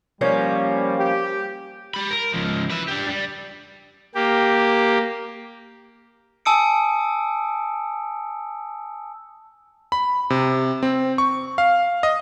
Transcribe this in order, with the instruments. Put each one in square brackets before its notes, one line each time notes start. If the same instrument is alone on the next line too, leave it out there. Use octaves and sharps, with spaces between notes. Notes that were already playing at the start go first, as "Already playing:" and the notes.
[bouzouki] F3 A#3 C#4 [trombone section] G3
[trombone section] G4
[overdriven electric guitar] G4 B5
A#4
C#2 F3
B4 E5
D4 G4
G3
[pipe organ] A#3 G4
[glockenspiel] G#5 A5 D#6 E6 C#7 D7
[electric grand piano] B5
C3
C4
C#6
F5
D#5